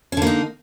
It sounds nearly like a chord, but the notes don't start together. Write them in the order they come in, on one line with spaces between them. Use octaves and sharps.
C#4 D3 A#3 D#4